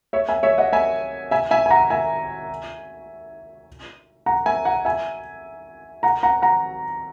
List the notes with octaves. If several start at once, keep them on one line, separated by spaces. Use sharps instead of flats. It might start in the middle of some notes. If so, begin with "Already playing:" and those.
C#5 E5
E5 G#5
C#5 E5
D#5 F#5
E5 G#5
E5 G#5
E5 G#5
G#5
F#5 A#5
E5 G#5
F#5 A#5
E5 G#5
F#5 A#5
E5 G#5
F#5 A#5
F#5 A#5
F#5 A#5